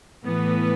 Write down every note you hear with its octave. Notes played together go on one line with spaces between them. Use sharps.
A2 E3 B3